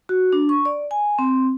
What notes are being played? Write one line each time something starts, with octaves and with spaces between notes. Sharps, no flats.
F#4
D4
C#6
D5
G#5
C4